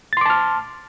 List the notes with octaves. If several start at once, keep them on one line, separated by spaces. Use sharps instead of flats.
A5 C6 D6 F6 A6